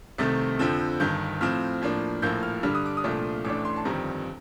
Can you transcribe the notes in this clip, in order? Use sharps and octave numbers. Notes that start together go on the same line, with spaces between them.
C2 C3 D#3 A3 C4 A6
F2 D3 F3 C4
G1 G2 D#3 G6
A2 F3 C4 F6
A2 F3 A#3 D4
A#1 A2 F3 A#3 G6
F6
G2 D3 G3 D4 F6
D#6
D6
D#6
C2 A#2 F3 A3 D4
A1 A2 A3 D4 D6
C6
A5
G1 F2 D#3 G3 C4 A#5